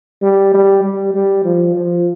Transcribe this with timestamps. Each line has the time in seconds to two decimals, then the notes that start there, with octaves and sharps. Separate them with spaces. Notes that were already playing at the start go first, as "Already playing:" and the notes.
0.22 G3
0.54 G3
0.84 G3
1.14 G3
1.45 F3
1.76 F3